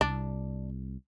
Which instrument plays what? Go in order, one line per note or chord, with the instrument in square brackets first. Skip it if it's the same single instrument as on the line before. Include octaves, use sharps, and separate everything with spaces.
[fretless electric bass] C2 [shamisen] D4